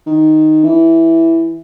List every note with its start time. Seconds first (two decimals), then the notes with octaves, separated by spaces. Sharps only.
0.06 D#3
0.64 E3